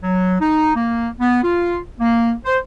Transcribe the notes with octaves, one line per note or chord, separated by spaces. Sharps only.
F#3
D#4
A#3
B3
F4
A#3
C5